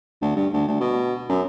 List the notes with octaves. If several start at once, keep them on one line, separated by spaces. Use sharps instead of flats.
D2
G2
D2
D2
B2
F#2